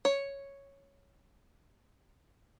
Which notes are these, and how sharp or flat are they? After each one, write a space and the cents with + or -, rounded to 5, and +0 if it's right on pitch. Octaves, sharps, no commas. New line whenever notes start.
C#5 +0